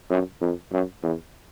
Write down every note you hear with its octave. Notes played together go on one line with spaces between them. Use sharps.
F#2
F2
F#2
E2